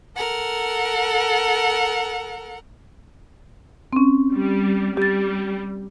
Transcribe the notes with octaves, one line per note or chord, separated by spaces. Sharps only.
A4 A#4 F#5
C4 C#4
G3
G3 G4 A6